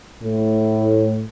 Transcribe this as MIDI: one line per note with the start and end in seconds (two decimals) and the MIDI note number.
0.23 1.23 45